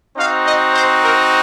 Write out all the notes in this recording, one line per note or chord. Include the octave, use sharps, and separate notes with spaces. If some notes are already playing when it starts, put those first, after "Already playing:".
C4 D#4 F#4 F5
D#5
C5
A#4